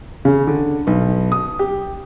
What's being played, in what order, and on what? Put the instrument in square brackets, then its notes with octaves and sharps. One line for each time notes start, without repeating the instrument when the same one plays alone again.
[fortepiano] C#3
D3
B1
D#6
G4